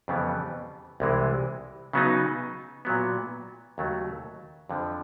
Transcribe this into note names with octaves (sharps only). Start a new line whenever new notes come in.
F2 C#3 E3 G3 B3
C2 C3 E3 G#3
C#3 F#3 B3 D#4
A#2 F#3 B3
D#2 C#3 F#3 A3
F2 D3 F3